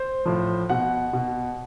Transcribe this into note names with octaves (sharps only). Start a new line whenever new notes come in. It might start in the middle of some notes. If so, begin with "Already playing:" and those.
Already playing: C5
A2 F3
B2 F#5
B2